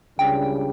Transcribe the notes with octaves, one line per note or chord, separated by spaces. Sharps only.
C#2 C#3 G3 D4 G5